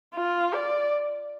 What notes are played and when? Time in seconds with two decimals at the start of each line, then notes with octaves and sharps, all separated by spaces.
0.15 F4
0.53 D5